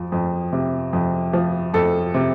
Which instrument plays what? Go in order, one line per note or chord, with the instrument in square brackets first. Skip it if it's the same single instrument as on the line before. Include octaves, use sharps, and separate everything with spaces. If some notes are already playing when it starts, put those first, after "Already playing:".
Already playing: [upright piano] F2 F3
F2
C3
F2
F3
F2 A4
C3